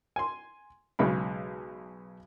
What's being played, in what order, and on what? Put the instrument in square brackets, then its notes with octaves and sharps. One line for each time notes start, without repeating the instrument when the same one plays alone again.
[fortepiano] G#5 C6
B1 C#3 G#3 B5